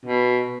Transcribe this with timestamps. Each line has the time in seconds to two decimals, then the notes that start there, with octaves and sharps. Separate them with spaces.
0.05 B2